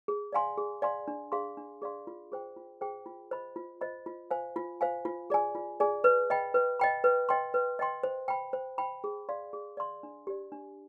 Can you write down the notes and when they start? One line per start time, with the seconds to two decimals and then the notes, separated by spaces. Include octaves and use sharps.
0.08 G#4
0.33 D5 F5 G#5 C6
0.58 G#4
0.82 D5 F5 G#5 C6
1.08 D4
1.32 G#4 D5 F5 C6
1.57 D4
1.82 G#4 D5 F5 C6
2.07 F4
2.32 G#4 C5 G5
2.57 F4
2.81 G#4 C5 G5
3.06 F4
3.31 C5 D#5 B5
3.56 F4
3.81 C5 D#5 B5
4.06 F4
4.31 C5 F5 G#5
4.56 F4
4.81 C5 F5 G#5
5.05 F4
5.30 G#4 D5 G#5
5.55 F4
5.80 G#4 D5 G#5
6.04 B4
6.30 D#5 G5 B5
6.54 B4
6.80 D#5 G5 B5
7.04 B4
7.29 D#5 G5 C6
7.54 B4
7.79 D#5 G5 C6
8.03 C5
8.28 G5 B5
8.53 C5
8.78 G5 B5
9.04 G#4
9.29 D5 F5 C6
9.53 G#4
9.77 D5 F5 C6
10.03 D4
10.27 G4 D5
10.52 D4